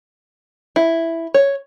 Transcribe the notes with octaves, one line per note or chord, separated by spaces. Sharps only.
E4
C#5